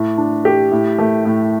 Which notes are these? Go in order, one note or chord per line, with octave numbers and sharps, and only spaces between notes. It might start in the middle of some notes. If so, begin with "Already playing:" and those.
Already playing: A2
D4
G4
A2
A3
A2